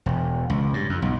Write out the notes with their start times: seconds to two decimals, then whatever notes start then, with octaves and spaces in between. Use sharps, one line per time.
0.06 E1
0.50 C#2
0.74 G2
0.90 F2
1.02 B1